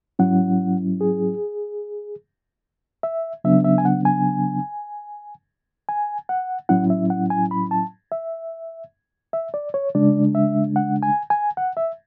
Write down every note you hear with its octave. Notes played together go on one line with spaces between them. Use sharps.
G#2 F#3 C#4 E4 F#5
G#4
E5
C#3 F#3 B3 D4 E5
E5
G#5
F#5
G#5
G#5
F#5
A2 F#3 C#4 E4 F#5
E5
F#5
G#5
B5
A5
E5
E5
D5
C#5
C#3 G#3 D4 D5
E5
F#5
G#5
G#5
F#5
E5